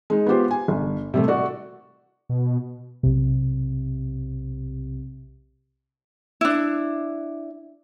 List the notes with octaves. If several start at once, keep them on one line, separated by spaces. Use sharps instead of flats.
G#3 D#4
B3 F4 G4 C5
G#5
G1
C3 G3 A3
F#4 D5
B2
B1 C3
D4 E4